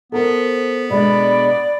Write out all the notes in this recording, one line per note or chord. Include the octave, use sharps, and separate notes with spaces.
B3 A4 A#4 C5
B2 G#3 D4 D5 B5